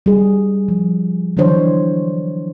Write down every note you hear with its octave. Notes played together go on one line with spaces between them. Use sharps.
G3 G#4
F3
D3 E3 F#3 D4 C5 C#5